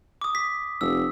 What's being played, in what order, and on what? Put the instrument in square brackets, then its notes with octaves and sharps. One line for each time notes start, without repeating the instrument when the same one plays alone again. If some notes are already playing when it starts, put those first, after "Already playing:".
[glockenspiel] D6 D#6
B6
[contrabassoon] F1 [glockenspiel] E6